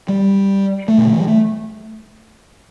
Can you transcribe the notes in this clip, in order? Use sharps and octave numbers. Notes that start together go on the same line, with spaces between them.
G3
A3
B2
D3
E3
G3
A3